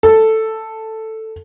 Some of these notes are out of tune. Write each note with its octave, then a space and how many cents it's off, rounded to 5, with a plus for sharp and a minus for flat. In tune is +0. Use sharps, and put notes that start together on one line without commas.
A4 +5